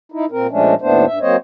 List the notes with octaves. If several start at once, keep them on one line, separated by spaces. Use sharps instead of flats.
D#4 E4
A#2 C4 A#4
A#2 F3 G#3 A3 C#4 D4
D#2 A2 A3 B3 D4 C5
G2 E5
F#3 A#3 C4 C5 C#5 D#5